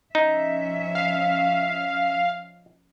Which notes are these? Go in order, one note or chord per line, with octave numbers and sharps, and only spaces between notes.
F3 C#4 D#4 E5
F5